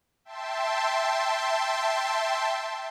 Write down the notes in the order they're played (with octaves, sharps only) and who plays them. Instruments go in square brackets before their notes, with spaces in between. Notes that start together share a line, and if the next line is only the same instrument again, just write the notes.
[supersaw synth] E5 G5 A5 C6